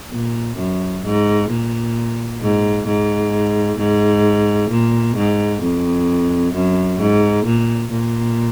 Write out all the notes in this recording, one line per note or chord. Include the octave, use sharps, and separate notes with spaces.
A#2
F#2
G#2
A#2
G#2
G#2
G#2
A#2
G#2
F2
F#2
G#2
A#2
A#2